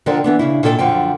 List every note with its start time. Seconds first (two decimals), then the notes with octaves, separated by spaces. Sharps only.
0.06 D3 D#3 F3 A#4 D5 G5
0.24 E3 B3 D4
0.39 C#3 D4 E4
0.63 A#2 D#3 E4 A4 C#5 G5
0.78 F#2 D3 F3 G5